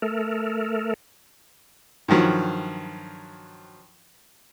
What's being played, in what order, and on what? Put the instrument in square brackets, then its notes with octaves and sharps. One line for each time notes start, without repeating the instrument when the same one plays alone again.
[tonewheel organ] A3 A4 A#4
[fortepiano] G2 D#3 F3 F#3